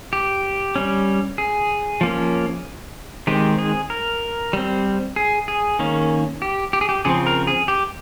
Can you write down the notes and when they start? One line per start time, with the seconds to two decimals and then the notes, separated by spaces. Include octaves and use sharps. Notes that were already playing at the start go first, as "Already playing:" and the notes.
0.13 G4
0.76 G3 C#4
1.38 G#4
2.01 F3 A#3 C#4
3.27 D#3 G#3 C4 G4
3.58 G#4
3.90 A#4
4.53 G3 C4
5.16 G#4
5.48 G#4
5.79 D#3 A#3 C#4
6.42 G4
6.73 G4
6.81 G#4
6.89 G4
7.05 C#3 F3 C4 G#4
7.27 A#4
7.47 G#4
7.68 G4